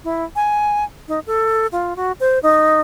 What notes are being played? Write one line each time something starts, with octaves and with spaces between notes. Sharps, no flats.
E4
G#5
D#4
A4
F4
F#4
C5
D#4